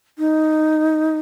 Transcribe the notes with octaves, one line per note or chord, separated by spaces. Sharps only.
D#4